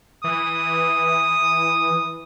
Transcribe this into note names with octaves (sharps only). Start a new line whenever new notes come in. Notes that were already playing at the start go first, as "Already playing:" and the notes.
E3 D#6